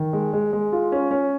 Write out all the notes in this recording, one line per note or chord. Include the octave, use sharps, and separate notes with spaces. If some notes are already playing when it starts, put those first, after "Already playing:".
Already playing: D#3
G#3
G#3
G#3
F4
C#4
C#4